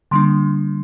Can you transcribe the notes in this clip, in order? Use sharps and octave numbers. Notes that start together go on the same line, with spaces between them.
D3 G3 A#3 D4 C6